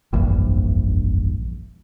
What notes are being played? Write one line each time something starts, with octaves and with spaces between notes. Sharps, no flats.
F1 A#1 E2 G2